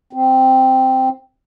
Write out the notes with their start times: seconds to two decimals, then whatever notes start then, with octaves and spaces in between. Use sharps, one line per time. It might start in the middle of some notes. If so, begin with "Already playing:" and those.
0.13 C4